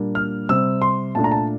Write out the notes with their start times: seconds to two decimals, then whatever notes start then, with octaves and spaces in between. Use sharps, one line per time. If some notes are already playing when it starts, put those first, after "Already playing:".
Already playing: A#2 G3 A#3 D4
0.15 F6
0.49 C3 G3 C4 E6
0.82 C6
1.15 A#2 A3 D4 A5
1.24 A#5
1.32 A5